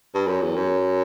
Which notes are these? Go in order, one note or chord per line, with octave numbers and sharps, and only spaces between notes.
G2
F#2
E2
F#2